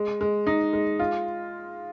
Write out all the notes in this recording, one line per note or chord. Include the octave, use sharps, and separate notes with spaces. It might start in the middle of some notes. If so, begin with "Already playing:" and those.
Already playing: G#3
G#3
D#4
G#3
F4